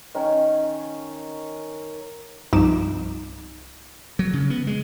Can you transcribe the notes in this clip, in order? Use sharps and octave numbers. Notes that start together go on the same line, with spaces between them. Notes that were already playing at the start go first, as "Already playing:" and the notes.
D#3 C#4 A#4
C2 G2 F3 D#4 D6 E7
F#3
C#3
B3
G#3